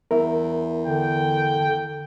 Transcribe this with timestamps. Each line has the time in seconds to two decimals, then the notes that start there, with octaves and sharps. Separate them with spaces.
0.11 E2 A#4 E5
0.87 D3 G5